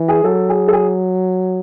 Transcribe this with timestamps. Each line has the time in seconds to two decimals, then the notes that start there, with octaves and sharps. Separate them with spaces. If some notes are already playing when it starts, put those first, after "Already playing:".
Already playing: E3
0.08 G#4
0.24 F#3 A4
0.49 G#4
0.68 A4
0.73 G#4